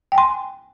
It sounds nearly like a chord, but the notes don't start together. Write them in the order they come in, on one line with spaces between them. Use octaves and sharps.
G5 G#5 C6